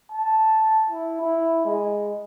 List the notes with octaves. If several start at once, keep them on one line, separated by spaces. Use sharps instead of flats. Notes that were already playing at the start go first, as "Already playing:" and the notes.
A5
E4
E4
G#3